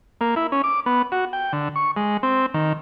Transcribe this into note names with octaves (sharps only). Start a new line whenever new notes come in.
A#3
E4
C#4
D6
B3
F#4
G5
D3
C#6
G#3
C4
D#3